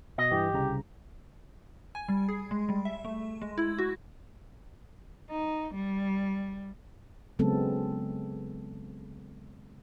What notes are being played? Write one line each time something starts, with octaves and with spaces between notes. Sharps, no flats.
B2 D#5
G2 E3 G4
C2 C#3 A#5
G#5
G3
G#4
G#3
G3
E5
A3
G#3
E4
F#4
D#4
G3
C#3 F#3 G#3 B3 C4 A4